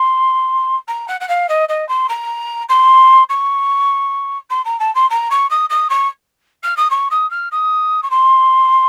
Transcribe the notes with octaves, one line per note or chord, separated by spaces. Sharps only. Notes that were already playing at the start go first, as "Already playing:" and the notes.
Already playing: C6
A#5
F#5
F#5
F5
D#5
D#5
C6
A#5
C6
C#6
C6
A#5
A5
C6
A#5
C#6
D#6
D#6
C#6
F6
D#6
C#6
D#6
F6
D#6
C#6
C6